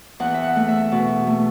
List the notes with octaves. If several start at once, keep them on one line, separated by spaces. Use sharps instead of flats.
E2 F#5
E5
F#5
A3
E5
B2
A3